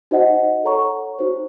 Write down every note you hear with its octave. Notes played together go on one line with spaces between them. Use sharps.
D#4 F#4 C5 D#5 F#5
A4 C#5 F#5 A#5 C#6
D#4 F#4 C5